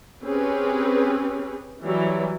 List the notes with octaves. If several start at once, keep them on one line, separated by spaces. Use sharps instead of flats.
C4 C#4 G4 G#4 B4
E3 F#3 G3 E4